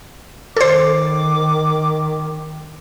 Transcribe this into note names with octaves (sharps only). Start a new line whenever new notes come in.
D#3 A4 C5 D6